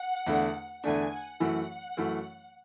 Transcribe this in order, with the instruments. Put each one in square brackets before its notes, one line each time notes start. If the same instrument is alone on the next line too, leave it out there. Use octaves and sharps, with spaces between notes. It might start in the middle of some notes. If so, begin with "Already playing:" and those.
Already playing: [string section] F#5
[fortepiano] E2 D3 A3 D4
[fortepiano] E2 D3 A3 D4 [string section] G#5
[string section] F#5
[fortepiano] F#2 E3 A3
F#2 E3 A3